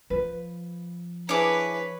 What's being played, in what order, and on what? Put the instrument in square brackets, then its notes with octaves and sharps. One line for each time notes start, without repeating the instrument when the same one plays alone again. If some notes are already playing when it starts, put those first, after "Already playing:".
[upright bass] F3 [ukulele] B4
[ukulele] D4 E4 G#4 [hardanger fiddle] B4 [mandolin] C#5 D6